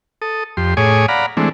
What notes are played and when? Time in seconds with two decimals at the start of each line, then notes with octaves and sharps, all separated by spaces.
0.22 A4 D#6
0.57 F2 G4 C6
0.77 A2 G#4 C#5 G#5 D6 D#6
1.09 D5 F5 F#5 A#5 B5
1.37 E3 G#3 A3 C4 D4